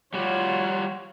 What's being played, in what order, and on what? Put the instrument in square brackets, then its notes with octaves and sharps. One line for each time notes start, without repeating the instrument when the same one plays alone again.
[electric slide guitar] G3 F#4 [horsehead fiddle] F4 C#5